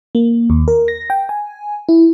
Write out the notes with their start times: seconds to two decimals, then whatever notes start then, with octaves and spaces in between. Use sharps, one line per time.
0.15 A#3
0.50 D#2
0.68 A#4
0.88 A#6
1.10 G5
1.29 G#5
1.89 E4